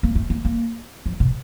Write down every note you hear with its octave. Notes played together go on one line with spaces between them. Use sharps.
A#3
A3
A#3
A#3
F3
B2